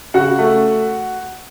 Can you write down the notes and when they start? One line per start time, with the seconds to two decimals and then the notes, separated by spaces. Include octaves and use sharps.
0.14 C#3 F#4 F#5
0.39 A3